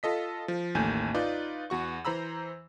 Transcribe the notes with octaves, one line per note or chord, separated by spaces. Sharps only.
F4 A4 D#5 B6
F3
A1 D#2 A3 G#5 G6
D#4 F4 B4 D5
E2 F#4 C#6
E3 C5 A#5 B5 E6